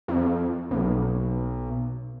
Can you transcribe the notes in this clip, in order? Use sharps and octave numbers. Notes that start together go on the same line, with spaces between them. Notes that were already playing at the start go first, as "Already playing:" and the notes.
F2
B1